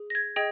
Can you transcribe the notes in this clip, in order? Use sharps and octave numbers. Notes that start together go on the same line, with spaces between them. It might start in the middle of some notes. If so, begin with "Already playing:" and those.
Already playing: G#4
A#6
G#6
G#4 D#5 G5 G#6